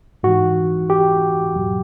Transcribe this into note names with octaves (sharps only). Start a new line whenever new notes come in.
G#2 E3 F#4
G4
E2 B2 F#3